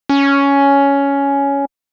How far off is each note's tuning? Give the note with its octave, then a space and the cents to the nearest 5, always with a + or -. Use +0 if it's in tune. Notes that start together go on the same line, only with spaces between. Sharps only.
C#4 +10